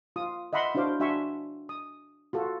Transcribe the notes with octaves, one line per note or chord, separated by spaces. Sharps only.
F4 D#6
D#5 E5 F#5 B5 C6
D4 E4 F#4 C5 F5 D6
D4 F#4 E5 G#5 C6 C#6
D#6
F4 F#4 A4